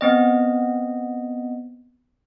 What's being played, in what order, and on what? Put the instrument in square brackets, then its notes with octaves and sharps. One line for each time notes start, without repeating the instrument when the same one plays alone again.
[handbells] B3 C4 D#5